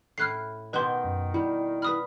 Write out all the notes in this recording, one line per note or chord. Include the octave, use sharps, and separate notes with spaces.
A2 E4 F6 F#6 C7
B2 D#3 G4 B4 C6
F#2
G3 E4
B4 B5 D#6 F6